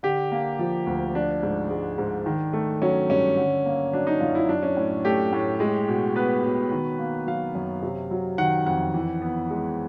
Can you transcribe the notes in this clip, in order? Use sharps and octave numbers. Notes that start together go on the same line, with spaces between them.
D3 G4
A#3
F3
D2
F3 D4
G#2
G#3
G#2
D#3
A3
F#3 C#4
G2 C#4
D3
A#3
F#3 D4
D#4
F#2 F4
E4
F#3 D4
C#4
A2
A3 G4
A2
G#3
B2
B3 B4
B2
D#3
A#3
F#3 F5
F#2
C3
F#3
D#3 F#5
F2 F#5
E3
B3
G#3